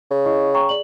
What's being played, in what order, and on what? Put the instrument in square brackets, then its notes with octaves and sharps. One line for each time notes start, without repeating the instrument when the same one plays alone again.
[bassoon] C#3
[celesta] E4 D#5 C#6
G5 A#5 C#6
G#4 D5 F#7